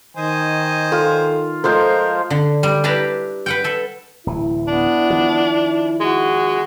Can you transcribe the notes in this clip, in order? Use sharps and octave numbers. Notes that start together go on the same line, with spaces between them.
D#3 C5 D#5 G#5
F4 A4
F3 G#3 A4 A#4 C5
D3
G3
D4 E4 G4 B4 A5 A#5
B4 F#5 G5
A4 E5
D1 E3 E4
B3 D4
D#3 F3
G#3 F#4